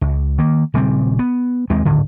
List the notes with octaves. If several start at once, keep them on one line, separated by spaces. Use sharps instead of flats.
C#2
D#3 A#3
D#1 C#3 G3 C4
B3
D#2 G#3 C4
D1 G#1 D3